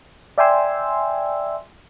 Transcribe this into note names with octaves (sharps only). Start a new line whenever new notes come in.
D5 E5 G5 G#5 C6 E6